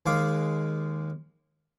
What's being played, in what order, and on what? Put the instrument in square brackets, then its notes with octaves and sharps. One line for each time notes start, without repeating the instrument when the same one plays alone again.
[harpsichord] D#2 G#3 F5 D6